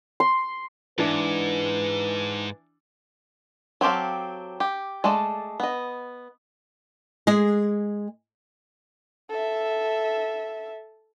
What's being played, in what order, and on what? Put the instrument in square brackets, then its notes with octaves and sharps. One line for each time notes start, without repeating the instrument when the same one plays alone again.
[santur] C6
[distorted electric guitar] G#2 [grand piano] E3 D4 [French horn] B4
[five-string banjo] F#3 C4 G4 A4 F5
G4
G#3 A3 A4 D5
B3 D#5
[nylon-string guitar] G#3 G#4
[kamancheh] A4 E5